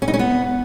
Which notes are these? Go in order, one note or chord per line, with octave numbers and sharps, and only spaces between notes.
C#4
D#4
C#4
B3